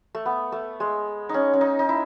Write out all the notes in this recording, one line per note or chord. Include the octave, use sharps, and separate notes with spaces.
A3
B3
A3
G#3
C#4 D#4
C#4
D#4
D#4
E4